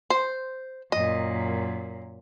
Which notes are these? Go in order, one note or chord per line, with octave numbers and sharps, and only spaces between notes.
C5
F#2 A#2 D#5